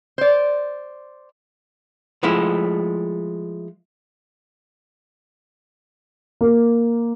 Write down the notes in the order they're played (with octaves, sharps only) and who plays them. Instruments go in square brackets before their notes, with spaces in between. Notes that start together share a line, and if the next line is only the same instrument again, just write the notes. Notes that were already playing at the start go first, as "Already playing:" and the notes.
[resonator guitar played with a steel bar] C5 D5
[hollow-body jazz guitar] F3 G#3 A3 E4
[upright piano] A#3